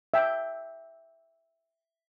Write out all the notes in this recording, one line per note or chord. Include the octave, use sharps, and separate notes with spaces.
E5 G5